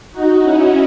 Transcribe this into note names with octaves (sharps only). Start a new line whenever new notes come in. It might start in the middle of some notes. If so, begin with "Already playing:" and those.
D#4 F#4
C#4 E4